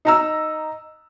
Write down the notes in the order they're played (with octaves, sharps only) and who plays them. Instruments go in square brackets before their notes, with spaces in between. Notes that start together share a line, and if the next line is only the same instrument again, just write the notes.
[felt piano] D#4 A#5 E6